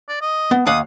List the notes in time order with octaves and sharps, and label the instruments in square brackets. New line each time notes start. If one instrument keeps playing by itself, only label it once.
[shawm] D5
D#5
[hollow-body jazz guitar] B3
[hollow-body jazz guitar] D#2 F5 F#5 [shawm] D#6